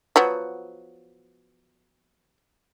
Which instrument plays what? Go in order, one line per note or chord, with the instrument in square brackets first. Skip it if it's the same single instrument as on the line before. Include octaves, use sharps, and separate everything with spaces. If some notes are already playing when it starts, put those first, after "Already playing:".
[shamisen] F3 F#3 B3